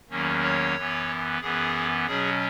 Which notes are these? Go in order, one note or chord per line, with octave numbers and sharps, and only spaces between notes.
E2 D#3 F#3 A#3 C#4
C#5
F#2 E3 B3
F#2 E3 B3 G#4
B2 F#3 C#4 G#4